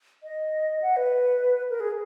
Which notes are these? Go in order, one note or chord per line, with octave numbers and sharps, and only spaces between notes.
D#5
F#5
B4
A#4
G#4